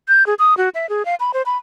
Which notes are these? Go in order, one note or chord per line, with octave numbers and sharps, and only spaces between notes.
G6
G#4
D#6
F#4
E5
G#4
F5
B5
C5
B5